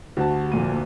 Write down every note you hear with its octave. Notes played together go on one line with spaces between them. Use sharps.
D2 F#4 G4 A5
F1 A#2 D#7